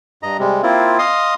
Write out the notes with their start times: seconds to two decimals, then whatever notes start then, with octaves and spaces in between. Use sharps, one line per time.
0.23 G2 D#5 A#5
0.39 C3 G3 G#3
0.63 A#3 C4 E4 F4
0.99 D#5 F5 C6 D#6